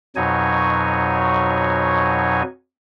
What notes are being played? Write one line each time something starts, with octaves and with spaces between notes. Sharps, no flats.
F2 B2 F#3 D#4 C#5 G#5